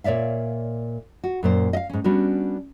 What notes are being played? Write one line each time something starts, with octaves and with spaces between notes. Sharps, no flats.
A#2 C#5 D5 E5 F5
F#4
F#2 A#2 C5
D#5 F5
G#2 C#4
G3 B3 C#4 D4 F#4